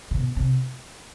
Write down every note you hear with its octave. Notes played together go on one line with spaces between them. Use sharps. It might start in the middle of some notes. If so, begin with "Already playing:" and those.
C3
B2
C3